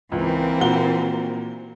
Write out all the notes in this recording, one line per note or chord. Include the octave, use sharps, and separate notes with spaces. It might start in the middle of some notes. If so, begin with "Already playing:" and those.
C#2 E3 A#3 C4
A#2 F#4 G7